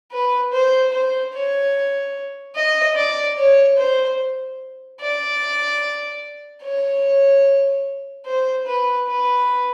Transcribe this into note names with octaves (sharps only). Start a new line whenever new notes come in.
B4
C5
C5
C#5
D#5
D5
C#5
C5
D5
C#5
C5
B4
B4